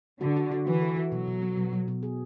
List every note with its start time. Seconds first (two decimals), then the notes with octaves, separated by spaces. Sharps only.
0.21 D3 F#4
0.36 F#4
0.51 F#4
0.67 E3 F#4
0.82 A4
0.96 F#4
1.12 B2 F#3
1.27 B2
1.42 B3
1.57 B2
1.73 B2
1.88 B2
2.03 G#4